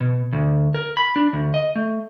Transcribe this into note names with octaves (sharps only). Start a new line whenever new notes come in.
B2
D2
A#4
B5
D4
D2
D#5
A3